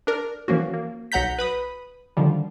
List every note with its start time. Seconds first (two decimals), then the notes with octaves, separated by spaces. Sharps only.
0.07 D4 A#4
0.48 E3 F3 A#3 C#4 F#4
0.74 A#3
1.12 B1 F#3 F#5 A#5 G6 B6
1.38 B4 B5 D#6
2.17 D3 D#3 F3 G3